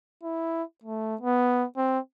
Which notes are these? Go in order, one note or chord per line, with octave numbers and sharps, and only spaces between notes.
E4
A3
B3
C4